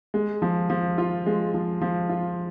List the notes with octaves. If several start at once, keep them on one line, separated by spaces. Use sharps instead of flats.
G#3
F3
F3
F4
G#3
F3
F3
F4